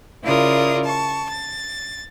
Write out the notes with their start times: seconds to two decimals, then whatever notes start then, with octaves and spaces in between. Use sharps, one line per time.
0.23 C#3 E4 F4 A#4 D5 D#6
0.84 A5 C#6
1.29 A6